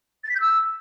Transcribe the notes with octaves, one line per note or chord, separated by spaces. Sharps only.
A6
B6
G6
E6